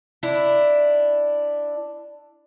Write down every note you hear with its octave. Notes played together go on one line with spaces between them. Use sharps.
D4 E4